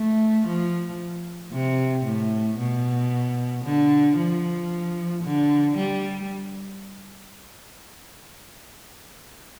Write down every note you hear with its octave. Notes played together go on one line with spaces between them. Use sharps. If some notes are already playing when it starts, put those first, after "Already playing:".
Already playing: A3
F3
C3
A2
B2
D3
F3
D3
G3